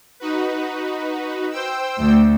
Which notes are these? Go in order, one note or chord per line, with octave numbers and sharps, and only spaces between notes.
D#4 F#4 B4
C5 G5 E6
D2